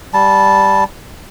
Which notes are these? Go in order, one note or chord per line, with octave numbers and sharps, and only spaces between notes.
G3 A5